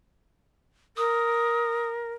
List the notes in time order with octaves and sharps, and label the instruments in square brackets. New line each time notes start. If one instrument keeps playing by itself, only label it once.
[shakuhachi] A#4 [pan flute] D#6